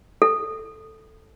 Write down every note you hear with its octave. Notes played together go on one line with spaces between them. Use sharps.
A4